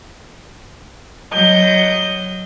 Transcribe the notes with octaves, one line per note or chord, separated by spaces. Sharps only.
F#3 D#5 G6